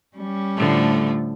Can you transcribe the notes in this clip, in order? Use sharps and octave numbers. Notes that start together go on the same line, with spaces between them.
G3 C#4
A2 D3 F3 A3